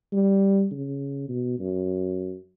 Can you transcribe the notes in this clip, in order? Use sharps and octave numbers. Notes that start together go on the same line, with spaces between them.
G3
C#3
B2
F#2